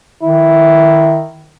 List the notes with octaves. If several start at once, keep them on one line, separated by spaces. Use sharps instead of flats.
D#3 E4